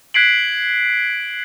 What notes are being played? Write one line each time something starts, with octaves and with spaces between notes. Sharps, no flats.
F#6 G#6 B6 C7 D7 F#7